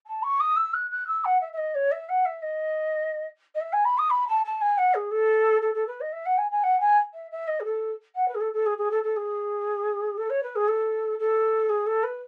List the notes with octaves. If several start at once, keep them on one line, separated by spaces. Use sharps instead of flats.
A5
C#6
D#6
E6
F#6
F#6
E6
F#5
E5
E5
D#5
C#5
E5
F#5
E5
D#5
D#5
E5
G#5
B5
D#6
B5
A5
A5
G#5
F#5
G#4
A4
A4
A4
B4
D#5
E5
F#5
G#5
G#5
F#5
G#5
E5
E5
D#5
G#4
A4
F#5
B4
G#4
A4
A4
G#4
G#4
A4
A4
G#4
A4
C#5
B4
G#4
A4
A4
G#4
A4
B4